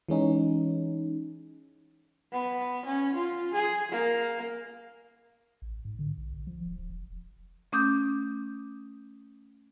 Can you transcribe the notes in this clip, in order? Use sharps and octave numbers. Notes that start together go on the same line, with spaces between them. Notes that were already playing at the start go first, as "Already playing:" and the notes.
E3 G#3 C#4 D#4
B3
C#4
F4
G#4
A#3
A1
G#2
D3
A#1
A#1
F3
D#1
D1
E1
A3 C#4 D6 D#6 G6